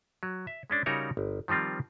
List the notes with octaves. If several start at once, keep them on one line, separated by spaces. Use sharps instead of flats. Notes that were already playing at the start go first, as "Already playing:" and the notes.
F#3
E5
G#3 C#4 D4
C#3 G3 D#4 F#4 A#4 C#5
G1
D#3 F3 G3 C4 F4